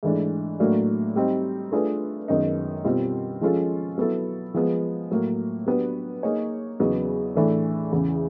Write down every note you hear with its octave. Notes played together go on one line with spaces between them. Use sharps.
G#2 E3 A3 D4
A2 F#3 A#3 D4 F#4
G3 C4 D#4
A3 D4 F4 G#4 B4
F#2 D#3 G#3 B3 D#4
B2 G3 C4 F4
F3 G#3 C#4 F4 A4
F#3 B3 E4 A4
F3 G#3 B3
A2 F#3 A#3
F#3 B3 D4 G4 B4
A#3 D#4 G#4 C#5
E2 C#3 F#3 B3 D#4
A2 E3 A3 D4
E2 C#3 E3